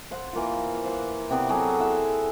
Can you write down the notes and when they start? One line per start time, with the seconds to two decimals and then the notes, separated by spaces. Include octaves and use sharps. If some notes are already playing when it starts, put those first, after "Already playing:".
0.11 C5 F#5
0.33 E3 A#3 F4
0.84 C5 F#5 C6
1.30 C3 B3 C4 D5
1.49 F#3 G#4 A4
1.80 E4 E5 F#5 C6